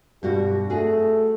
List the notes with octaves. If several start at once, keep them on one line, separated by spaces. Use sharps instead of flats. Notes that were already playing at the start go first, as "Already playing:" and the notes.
G2 B2 F#4 G4
A3 F#4 G#4